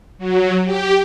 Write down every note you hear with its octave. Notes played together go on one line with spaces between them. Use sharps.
F#3
G4